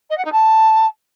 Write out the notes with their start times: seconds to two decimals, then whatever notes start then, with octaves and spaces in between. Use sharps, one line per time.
0.10 D#5
0.17 F#5
0.24 D#4
0.32 A5